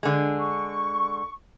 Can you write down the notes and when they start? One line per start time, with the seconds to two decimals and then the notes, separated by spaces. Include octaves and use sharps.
0.03 D3 G#3
0.39 C#6